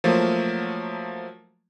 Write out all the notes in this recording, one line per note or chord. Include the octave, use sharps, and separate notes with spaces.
F3 F#3 A3 A#3